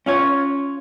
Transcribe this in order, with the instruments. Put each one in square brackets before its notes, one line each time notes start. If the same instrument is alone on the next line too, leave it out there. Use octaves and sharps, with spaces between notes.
[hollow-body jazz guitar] C#4 F4 C#5